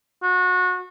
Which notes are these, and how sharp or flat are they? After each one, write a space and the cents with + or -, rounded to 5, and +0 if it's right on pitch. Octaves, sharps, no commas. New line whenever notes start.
F#4 -25